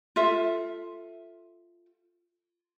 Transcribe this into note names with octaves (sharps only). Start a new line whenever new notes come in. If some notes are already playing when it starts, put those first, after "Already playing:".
F4 A4 E5